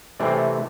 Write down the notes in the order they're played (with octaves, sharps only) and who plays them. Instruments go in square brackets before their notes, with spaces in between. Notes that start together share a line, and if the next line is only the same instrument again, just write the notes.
[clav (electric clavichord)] C3 E3 A3 C4 D5